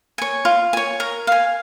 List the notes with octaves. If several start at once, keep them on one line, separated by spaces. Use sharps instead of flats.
C#5 G#5
F4
C#5 G#5
A#4
F5 G#5